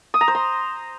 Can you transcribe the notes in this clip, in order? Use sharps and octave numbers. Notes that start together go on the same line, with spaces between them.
D#6
A#5
C5
C6